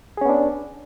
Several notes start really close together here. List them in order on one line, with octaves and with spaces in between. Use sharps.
G#4 C#4 B3 D4